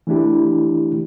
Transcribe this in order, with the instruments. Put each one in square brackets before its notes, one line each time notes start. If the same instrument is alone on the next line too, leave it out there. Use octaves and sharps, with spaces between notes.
[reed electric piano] E3 A3 D4 E4 G4